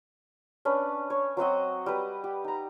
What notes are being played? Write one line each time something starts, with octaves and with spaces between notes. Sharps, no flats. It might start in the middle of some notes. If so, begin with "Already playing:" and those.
C#4 D4 B4
C#5
F#3 C4 F#4 D#5
G3 B4
G4
D#4 A#5